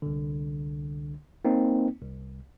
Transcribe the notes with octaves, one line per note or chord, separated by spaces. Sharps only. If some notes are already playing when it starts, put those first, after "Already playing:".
C2 D3
A#3 C4 D#4
C2